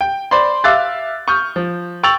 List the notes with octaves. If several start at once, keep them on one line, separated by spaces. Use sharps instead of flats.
G5
C5 D5 B5 C6
E5 F5 D6 E6 F#6 A6
C#6 D#6 F6 G6
F3
G5 C#6 E6 A6 F7 F#7